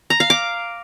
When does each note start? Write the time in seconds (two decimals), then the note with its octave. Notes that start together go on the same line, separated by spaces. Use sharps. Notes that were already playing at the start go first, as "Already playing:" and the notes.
0.10 A#5
0.20 F5
0.30 D6